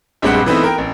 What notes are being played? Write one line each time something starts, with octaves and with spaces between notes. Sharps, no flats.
A#1 G2 G3 G#3 C4 F#5
E3 A3 B3 C4 D#4 E4
A#4 G5
A1